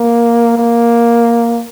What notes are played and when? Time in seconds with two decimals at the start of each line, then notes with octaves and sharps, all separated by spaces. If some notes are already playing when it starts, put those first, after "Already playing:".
Already playing: A#3
0.58 A#3